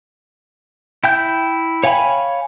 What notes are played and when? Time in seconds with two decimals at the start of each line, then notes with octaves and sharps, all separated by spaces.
1.04 E4 G5 G6
1.84 C#5 F5 G5 G#5 B5